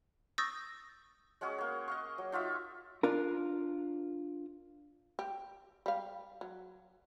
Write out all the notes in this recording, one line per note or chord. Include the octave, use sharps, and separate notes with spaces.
C#6 D#6 E6 G6 A6 A#6
G#3 C#4 F#4 G#4
A#3 C#5
D#5 F5 C#6
F#3
D#4 F4 F#4 E5
D4 F4 A#4
G4
G3 F5
F#3